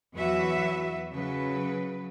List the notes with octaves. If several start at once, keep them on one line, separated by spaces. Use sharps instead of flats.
E2 E3 F#3 F#4 B4 E5
C#3 F#3 B4